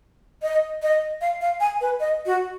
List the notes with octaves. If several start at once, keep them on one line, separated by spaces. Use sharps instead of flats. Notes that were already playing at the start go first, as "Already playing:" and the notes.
D#5
D#5
F5
F5
G#5
B4
D#5
F#4